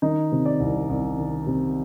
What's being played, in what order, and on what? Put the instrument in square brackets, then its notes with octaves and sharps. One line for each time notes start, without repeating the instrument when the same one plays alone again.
[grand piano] D#3 D#4
C3
D5
C2
C2
D#3
C3